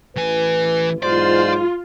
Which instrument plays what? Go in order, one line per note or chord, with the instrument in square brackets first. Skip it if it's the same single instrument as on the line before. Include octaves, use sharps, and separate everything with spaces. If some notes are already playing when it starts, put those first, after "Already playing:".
[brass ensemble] A1 E4 B4 [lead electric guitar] E3 G#5
[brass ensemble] B1 E2 G#2 [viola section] F4 [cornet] C5 [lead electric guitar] D5